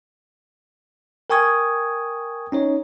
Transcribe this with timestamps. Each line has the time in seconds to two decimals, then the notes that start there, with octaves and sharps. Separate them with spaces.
1.30 A#4 G5 G#5 C#6 D#6 G#6
2.52 C#4 D#4 C#5